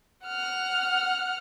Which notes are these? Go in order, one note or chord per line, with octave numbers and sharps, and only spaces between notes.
F#5 F6